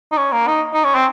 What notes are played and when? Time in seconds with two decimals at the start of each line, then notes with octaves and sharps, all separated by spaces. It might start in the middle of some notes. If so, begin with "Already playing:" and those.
0.12 D#4
0.18 C#4
0.33 A#3
0.48 D#4
0.74 D#4
0.84 C#4
0.95 C4